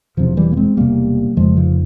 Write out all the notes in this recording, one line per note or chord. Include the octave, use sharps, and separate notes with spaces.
E1 E2 C3 F3
E3 G3
A#3
G#3 C4
E1 E2 C3 G3 A#3
F1 F2 C#3 F3 G#3
F3